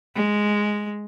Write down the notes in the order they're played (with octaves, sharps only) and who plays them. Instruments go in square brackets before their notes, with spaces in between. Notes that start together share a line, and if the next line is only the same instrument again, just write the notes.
[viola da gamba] G#3